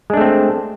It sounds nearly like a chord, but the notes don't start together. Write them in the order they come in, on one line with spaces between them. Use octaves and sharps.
G#3 D4 A3 C4